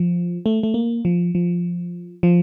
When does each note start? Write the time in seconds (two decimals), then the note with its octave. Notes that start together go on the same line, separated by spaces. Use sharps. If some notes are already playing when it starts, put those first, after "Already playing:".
Already playing: F3
0.46 A3
0.63 A3
0.74 A#3
1.05 F3
1.35 F3
2.23 F3